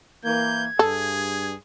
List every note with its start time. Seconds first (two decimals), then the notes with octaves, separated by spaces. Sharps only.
0.24 E3 A#3 G6 G#6
0.79 G2 G#4 A4